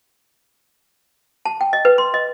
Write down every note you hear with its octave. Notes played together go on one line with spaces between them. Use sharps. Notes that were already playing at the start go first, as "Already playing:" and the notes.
A5
G5
D#5
B4
C6
D#5